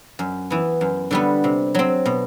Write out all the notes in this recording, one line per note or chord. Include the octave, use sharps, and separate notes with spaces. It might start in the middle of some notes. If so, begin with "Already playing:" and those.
F#2
E3 B3
F#2
D3 G3 B3
C3
F#3 C4
B2